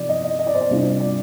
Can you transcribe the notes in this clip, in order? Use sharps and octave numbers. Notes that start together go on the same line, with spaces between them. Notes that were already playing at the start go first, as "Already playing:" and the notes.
Already playing: C3 F3 C4 D#4 D5
D#5
D#5
D#5
D5
C5
D5
C3 G3 D4 F4
D5